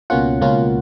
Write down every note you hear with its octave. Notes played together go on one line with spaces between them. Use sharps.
C#2 B2 A#3 C#4 F4 F#5
C#2 B2 A#3 C#4 F4